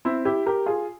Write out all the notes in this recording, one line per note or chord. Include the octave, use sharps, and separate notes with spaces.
C4 E4
E4 G4
G4 A#4
F4 G#4